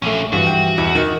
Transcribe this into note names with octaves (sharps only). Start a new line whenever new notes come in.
A#1 D3 A3 C#4
G2 E3 F3 F#4
G5
E2
D#3